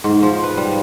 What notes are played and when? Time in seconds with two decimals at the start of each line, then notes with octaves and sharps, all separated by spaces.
0.04 G#2
0.23 F3
0.44 B4
0.57 G3